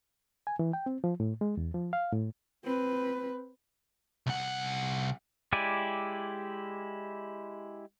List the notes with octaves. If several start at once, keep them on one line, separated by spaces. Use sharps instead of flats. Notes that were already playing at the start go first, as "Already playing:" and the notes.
G#5
E3
G5
C4
F3
A2
G#3
E2
F3
F5
A2
C4 B4
C2 F#5
G#3 E4 G4 D5 G#5